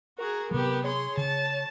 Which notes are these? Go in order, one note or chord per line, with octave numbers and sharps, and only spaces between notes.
F#4 G#4 A#4
C3 F#3 B3 G4
G#4 C#5 C6
C#3 A5